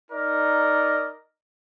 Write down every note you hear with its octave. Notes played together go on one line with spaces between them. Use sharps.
D#4 A#4 D5 D#5